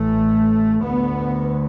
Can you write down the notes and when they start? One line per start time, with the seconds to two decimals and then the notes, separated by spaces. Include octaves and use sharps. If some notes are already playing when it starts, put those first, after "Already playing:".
Already playing: A1 A2 A3
0.83 D2 B3